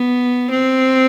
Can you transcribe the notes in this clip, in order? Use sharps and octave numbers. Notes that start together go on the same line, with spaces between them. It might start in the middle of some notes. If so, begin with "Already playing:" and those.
Already playing: B3
C4